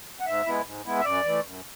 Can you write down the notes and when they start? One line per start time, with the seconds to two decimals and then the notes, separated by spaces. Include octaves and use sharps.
0.20 F#5
0.26 G#2 E5
0.46 G#3 B3 E4
0.66 G#2
0.86 G#3 B3 E4
1.00 E5
1.05 F#2 D5
1.25 E3 A3
1.45 F#2